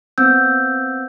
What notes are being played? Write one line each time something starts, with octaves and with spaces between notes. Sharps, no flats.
B3 C4 E6 G6